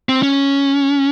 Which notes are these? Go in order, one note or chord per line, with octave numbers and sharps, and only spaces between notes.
C4
C#4